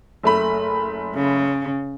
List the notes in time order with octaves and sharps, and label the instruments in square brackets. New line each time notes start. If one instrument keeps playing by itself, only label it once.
[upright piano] F#1 A3 B5
[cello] C#3